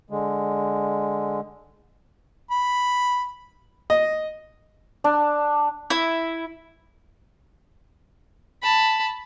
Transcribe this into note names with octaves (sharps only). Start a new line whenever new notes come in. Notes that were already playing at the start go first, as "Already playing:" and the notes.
D3 G#3
B5
D#5
D4
E4
A5 B5